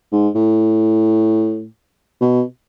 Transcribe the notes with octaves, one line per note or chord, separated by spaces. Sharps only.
G#2
A2
B2